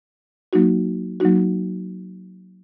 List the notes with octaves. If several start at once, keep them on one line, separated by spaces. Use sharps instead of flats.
F#3 A#3 D#4 F#4
F#3 A#3 D#4 F#4